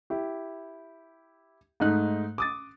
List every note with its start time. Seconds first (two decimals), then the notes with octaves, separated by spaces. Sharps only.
0.10 E4 G4
1.80 G#2 A3 D#4 F#6
2.38 D6 D#6 A6